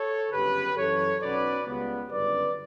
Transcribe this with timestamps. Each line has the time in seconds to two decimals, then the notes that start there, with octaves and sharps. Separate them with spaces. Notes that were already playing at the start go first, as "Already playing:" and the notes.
Already playing: A4 C#5
0.31 G1 F#2 C#3 G4 B4
0.76 F#2 C#3 E3 A4 C#5
1.21 B1 B2 F#3 C#4 B4 D5
1.66 C#2 C#3 G3 B3
2.11 G1 F#2 C#3 B4 D5